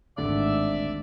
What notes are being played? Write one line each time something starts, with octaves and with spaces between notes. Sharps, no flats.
G#1 D2 G#2 D3 D5 E5